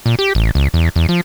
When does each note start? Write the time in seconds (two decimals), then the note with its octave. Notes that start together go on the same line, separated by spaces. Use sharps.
0.06 A#2
0.19 G4
0.35 A1
0.55 C#2
0.74 E2
0.96 E2
1.09 F3